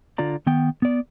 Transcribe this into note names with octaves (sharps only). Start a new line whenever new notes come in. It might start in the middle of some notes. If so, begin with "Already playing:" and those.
D3 F4 D5 A#5
D#3 B3 G5
B3 D5